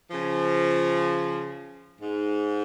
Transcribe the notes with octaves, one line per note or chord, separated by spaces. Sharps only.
C#3 F3
G#2